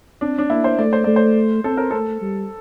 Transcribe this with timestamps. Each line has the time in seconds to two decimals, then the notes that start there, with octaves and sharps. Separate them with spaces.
0.21 C4 D4
0.39 D4
0.50 A#3 E4
0.64 C5
0.79 A3 D5
0.93 C5
1.04 A3 D5
1.16 C5
1.64 C4 A4
1.77 A#4
1.91 A3 A4
2.22 G3